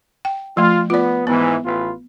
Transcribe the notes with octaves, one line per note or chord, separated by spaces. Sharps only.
G5
F3 A3 F4
B3 F4 D5
G#2 E3 B3
A1 F4 B4